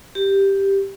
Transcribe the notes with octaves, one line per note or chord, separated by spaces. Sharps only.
G4